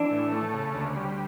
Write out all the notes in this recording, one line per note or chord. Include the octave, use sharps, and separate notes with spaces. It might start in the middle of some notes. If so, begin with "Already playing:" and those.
Already playing: E3 D4
A2
A3
C#3
D2
G3